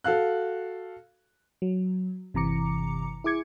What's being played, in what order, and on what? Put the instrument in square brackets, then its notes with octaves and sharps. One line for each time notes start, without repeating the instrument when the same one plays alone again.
[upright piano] F#4 A4 F5 F#6
[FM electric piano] F#3
G1 C3 E3 A#5 D6 C#7
E4 G#4 D6 G#6 C#7